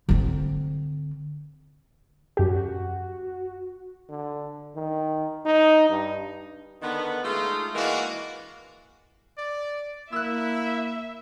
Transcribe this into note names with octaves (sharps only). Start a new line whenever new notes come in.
D3 C4
F#2 F#4 G4
D3
D#3
D#4
G2
D3 D#3 B3
G#3 A3 D#4 F4
E3 G#3 A#3 D4 F#4
D5
A#3 E4 E5 E6 F#6